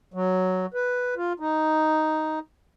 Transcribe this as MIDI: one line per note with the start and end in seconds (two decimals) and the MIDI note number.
0.14 0.66 54
0.74 1.14 71
1.17 1.33 65
1.40 2.39 63